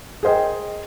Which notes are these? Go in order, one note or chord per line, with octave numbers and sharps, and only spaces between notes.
G#4 A#4 C5 D#5 G5